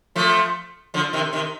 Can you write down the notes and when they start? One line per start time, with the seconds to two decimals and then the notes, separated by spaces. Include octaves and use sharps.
0.16 F3 A3
0.94 D3 F3
1.13 C3 D#3
1.33 C3 D#3